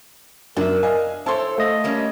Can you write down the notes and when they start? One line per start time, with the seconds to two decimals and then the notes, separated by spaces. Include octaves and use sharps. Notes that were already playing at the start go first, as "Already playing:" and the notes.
0.56 F#2 D4 A#4 E5
0.83 D#5 F5 G#5
1.26 E4 A4 C5 C#5 A5 C6
1.58 A3 D#5 F5
1.84 G3 A#3 C#4